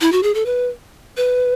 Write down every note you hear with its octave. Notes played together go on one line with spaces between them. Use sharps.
E4
F#4
G#4
A4
B4
B4